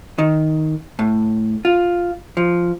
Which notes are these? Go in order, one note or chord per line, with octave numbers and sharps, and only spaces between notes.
D#3
A2
F4
F3